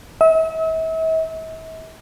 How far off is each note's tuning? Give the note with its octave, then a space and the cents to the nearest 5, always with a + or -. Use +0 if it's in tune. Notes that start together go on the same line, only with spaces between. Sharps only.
E5 -40